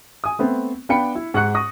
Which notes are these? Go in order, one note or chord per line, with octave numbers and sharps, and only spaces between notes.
G#5 D#6
A3 B3 C4
B3 D4 F5 G5 B5 C#7
E4 E5
G#2 F#5 C#6 F#6 C#7
C#6 D#6 A#6